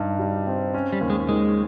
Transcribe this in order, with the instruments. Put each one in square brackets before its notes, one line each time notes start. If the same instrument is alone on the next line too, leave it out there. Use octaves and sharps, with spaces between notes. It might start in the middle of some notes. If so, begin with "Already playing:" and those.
Already playing: [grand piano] G2 D#4
G3
C4
C#4
[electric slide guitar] G3
[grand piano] D#2
[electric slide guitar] G#3
[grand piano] D#3 [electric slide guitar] G#3